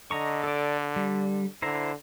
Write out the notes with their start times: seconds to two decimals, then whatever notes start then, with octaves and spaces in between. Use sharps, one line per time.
0.11 D3 D#5 A#5 C#6
0.44 A4 D5
0.96 G3
1.62 D3 E4 C5 A#5